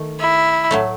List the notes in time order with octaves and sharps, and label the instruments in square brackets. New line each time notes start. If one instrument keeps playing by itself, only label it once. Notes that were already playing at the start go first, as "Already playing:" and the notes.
Already playing: [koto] D#3 A3
[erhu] E4
[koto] A2 F#3 A3